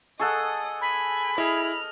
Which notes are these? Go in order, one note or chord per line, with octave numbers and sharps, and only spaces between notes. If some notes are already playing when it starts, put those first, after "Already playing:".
G#4 A4 D#5 F#5 C#6
G#5 B5
E4 G#4 D#5 F6